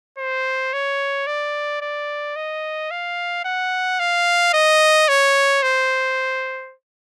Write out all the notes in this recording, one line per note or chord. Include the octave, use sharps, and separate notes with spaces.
C5
C#5
D5
D5
D#5
F5
F#5
F5
D#5
C#5
C5